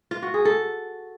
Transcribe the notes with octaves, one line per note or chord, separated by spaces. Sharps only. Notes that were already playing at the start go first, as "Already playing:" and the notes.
F4
F#4
G#4
A4